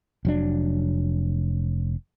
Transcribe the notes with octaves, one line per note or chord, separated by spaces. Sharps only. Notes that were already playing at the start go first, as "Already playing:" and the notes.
F1 F#3 D4